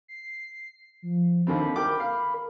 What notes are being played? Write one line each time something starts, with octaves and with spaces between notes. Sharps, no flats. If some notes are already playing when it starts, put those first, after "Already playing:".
C7
F3
D#2 D3 C4 B5
A#4 G5 D6
F5
A#4